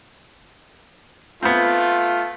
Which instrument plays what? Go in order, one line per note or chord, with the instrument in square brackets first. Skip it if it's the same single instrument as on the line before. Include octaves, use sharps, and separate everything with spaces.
[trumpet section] A3 F4 [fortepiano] B3 C4